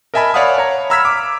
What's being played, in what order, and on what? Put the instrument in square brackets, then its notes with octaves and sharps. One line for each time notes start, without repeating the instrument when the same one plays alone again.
[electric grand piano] A#4 D#5 E5 G#5 A5 B5
C#5 D5 F5 F#5 B5 D#6
C#5 A#5
A#5 B5 E6 F6 G#6 B6
D6